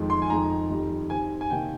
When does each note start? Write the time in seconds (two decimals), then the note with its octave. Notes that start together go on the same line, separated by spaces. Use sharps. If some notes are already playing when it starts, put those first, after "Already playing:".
Already playing: F2 D#3 G#3
0.10 C6
0.22 G#5
0.30 F2 D#3 G#3 D#4 A#5
0.70 F2 D#3 G3
1.10 D#3 G3 C4 G#5
1.41 G#5
1.50 C3 D#3 A#3 G5